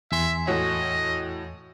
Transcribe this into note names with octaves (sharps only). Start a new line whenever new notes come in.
E2 E5 G#5 C6
A2 F#4 C#5 D#5